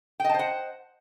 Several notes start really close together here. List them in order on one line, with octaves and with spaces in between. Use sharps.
G5 D#5 A5 C5 F#5